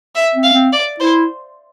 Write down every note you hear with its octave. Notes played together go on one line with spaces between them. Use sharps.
E5
C4
F5
C4
D5
E4 C5